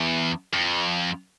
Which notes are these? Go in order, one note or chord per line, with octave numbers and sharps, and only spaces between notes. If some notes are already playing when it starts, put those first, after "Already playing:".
Already playing: E2
F2